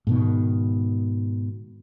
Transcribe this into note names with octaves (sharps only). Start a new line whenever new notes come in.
G#2 B2 D#3